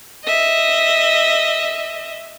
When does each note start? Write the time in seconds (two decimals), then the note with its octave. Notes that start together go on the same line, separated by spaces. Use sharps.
0.24 D#5 E5